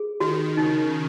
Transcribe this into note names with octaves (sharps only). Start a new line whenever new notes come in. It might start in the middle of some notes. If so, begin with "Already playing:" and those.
Already playing: G#4
D#3 F#4
C#3 D#4